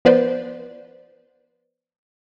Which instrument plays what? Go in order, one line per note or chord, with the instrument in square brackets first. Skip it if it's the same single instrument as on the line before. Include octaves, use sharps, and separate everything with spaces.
[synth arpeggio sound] F3 B3 B4 C5 D5